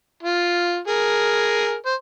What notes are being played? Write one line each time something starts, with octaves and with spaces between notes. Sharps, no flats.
F4
G#4 A#4
C5